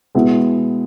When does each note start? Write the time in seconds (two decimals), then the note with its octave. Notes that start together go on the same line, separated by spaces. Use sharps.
0.15 B2 G#3 B3 E4